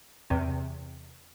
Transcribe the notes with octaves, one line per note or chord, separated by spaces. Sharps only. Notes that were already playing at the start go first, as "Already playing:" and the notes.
E2 C3